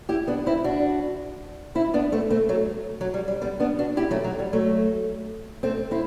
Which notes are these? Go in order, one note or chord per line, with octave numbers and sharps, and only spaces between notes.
E4 G4
B3 D4
C4 E4
D4 F#4
C4 E4
B3 D4
A3 C4
A3 C4
F#3 A3
F#3
G3
G3
G3 B3
B3 D4
D4 F#4
E4 G4
F#3 A3
F#3
G3
F#3 A3
A3 C4
C4 E4